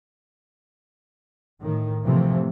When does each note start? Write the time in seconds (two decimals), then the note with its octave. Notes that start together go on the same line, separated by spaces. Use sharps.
1.61 A2 D#3
2.06 A2 C3 E3 F3 A3